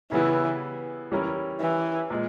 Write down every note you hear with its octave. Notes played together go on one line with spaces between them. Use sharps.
C#3 E3 G3 B3 E4
E3 G3 C#4 E4 A#4
E3
A#2 G#3